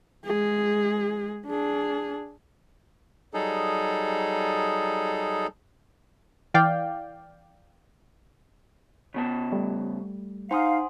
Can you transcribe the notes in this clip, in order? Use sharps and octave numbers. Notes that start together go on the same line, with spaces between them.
G#3 G#4
D4 G#4
F#3 G3 D#4 G#4 A4
E3 D5 F5 G5
C#3 B3 A5
G3 A3
D#4 C5 F5 F#5 G#5 C6 D#6